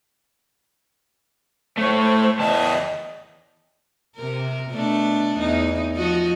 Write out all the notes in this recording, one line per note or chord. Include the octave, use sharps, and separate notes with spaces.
A3 C5 C#5
E2 D#5 A5
C3 A#4
B2 A3 D4
E2 D#4
F3 F#4 D#5